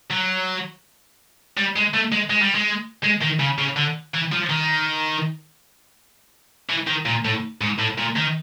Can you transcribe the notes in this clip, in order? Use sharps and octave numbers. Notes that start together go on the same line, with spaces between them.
F#3
G3
G#3
A3
G#3
G#3
G3
G#3
G#3
D#3
C#3
C#3
D3
E3
F3
D#3
E3
D#3
A#2
A2
G#2
A2
A#2
D#3